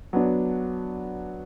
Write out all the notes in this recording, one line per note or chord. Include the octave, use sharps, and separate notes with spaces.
F#3 B3 D4